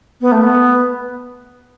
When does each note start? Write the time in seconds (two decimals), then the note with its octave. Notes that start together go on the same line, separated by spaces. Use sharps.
0.21 B3
0.32 A3
0.42 B3